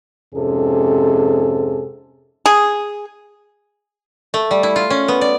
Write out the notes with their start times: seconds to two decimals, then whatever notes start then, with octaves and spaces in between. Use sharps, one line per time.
0.35 F2 G#2 C3 C#4 G#4 A4
2.46 G#4
4.34 A3
4.51 G3
4.63 E4
4.76 F4
4.90 C#4
5.08 B3
5.21 D5